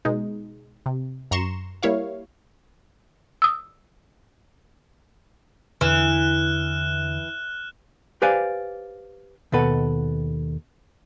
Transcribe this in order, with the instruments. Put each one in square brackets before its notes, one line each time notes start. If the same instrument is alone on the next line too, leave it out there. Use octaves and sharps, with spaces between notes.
[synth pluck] B2 G#3 D#4
C3
F#2 A#5 C6 C#6 E7
G3 A#3 E4 C#5 F5
[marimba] D#6 E6
[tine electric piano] E2 D3 [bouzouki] E3 [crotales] F6 F#6 E7
[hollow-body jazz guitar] G4 B4 C5 D5 F5 G#5
D#2 B2 A4 B4 F#5